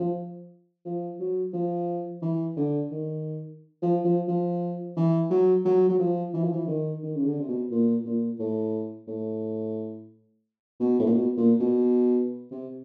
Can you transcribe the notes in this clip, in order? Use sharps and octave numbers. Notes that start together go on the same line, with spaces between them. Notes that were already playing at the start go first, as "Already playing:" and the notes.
Already playing: F3
F3
F#3
F3
E3
D3
D#3
F3
F3
F3
E3
F#3
F#3
F#3
F3
E3
F3
E3
D#3
D#3
C#3
D3
C3
B2
A#2
A#2
A2
A2
B2
A2
A#2
B2
A#2
B2
C3